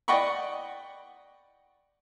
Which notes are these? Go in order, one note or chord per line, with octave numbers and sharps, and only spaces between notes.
D5 D#5 F#5 G5 B5 C#6